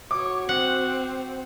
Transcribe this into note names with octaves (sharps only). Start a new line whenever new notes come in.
F#4 C#5 D6
C4 F#5